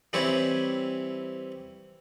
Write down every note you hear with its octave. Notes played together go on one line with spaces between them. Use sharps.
E3 G3 C4 E4 C#5